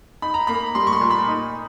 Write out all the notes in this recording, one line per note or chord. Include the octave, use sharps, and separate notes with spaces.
D#4 B5
A#5
A#3 B5
G3 C6
C#6
C6
A#2
B5
D#4